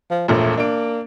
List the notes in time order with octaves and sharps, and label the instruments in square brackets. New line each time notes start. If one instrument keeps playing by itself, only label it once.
[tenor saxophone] F3
[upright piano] E1 A#1 A#2 [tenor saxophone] A3
[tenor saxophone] A#3 [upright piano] D4 D7